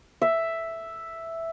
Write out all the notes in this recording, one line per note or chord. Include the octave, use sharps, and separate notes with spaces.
E5